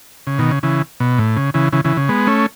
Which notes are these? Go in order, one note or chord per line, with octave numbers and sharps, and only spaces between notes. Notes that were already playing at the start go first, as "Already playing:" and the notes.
C#3
B2 D#3
C#3
C#3 E3
B2
A2
C#3
C#3 E3
C#3 E3
C#3 E3
C#3
G#3 B3
A3 C#4